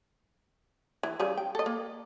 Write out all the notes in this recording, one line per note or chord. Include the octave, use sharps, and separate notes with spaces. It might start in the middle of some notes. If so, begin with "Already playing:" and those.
E3
C#3 G3 G#4
G5
A4 D#5
A#3